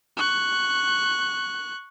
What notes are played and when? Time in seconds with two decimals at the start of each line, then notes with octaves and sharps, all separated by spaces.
0.17 C#6 F#6